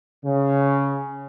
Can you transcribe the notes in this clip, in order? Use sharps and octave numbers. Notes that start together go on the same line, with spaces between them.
C#3